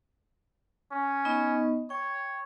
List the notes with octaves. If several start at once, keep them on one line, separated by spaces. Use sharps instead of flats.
C#4
B3 D#4 D#5
C#5 G5